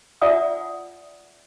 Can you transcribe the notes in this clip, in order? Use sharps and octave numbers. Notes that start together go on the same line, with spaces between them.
F4 D5 E5 F#5 G#5 D#6